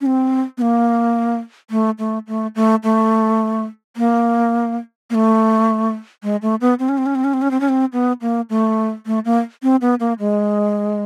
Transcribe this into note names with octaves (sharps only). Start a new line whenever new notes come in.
C#4
C4
B3
A#3
A3
A3
A3
A3
A3
A#3
A#3
A3
G#3
A3
B3
C4
C#4
C4
C#4
C4
C#4
C4
C#4
C4
C#4
C4
B3
A#3
A3
A3
A#3
C4
B3
A#3
G#3